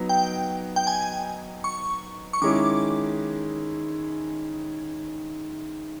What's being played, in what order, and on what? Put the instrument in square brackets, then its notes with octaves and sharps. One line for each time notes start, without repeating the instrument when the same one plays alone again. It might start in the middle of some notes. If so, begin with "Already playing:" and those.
Already playing: [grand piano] F#3 B3 D#4
[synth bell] G5
G5
G#5
C#6
C#6
[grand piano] D#3 G#3 C#4 E4 G#4 [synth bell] D6